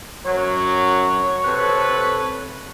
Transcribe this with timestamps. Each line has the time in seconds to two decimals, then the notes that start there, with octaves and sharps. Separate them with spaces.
0.26 F#2 F#3 C#5
1.45 C3 A4 B4